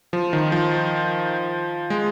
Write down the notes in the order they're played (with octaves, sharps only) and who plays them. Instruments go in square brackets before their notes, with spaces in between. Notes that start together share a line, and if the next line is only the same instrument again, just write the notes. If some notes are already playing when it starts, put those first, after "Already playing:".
[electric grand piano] F3
D#3
F3
G#3